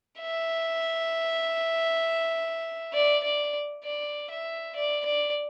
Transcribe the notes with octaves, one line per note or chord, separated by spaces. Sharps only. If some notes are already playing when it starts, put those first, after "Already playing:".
E5
D5
D5
D5
E5
D5
D5